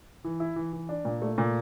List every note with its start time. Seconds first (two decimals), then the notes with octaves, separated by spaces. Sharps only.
0.24 E3
0.40 E4
0.56 E3
0.73 E3
0.89 D4
1.05 A#2
1.22 A3
1.38 A#2